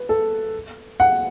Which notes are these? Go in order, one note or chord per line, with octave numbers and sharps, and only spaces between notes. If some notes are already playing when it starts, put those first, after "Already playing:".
Already playing: B4
A4
F#5